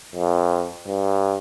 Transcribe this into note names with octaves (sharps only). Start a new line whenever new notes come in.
F2
G2